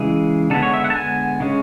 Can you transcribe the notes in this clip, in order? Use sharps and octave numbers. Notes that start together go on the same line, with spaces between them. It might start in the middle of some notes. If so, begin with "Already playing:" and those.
Already playing: C#3 E3 G#3 G#4
D3 G#3 B3 A4
C#5
E5
F#5
A5
G#5
C#3 G#3 C#4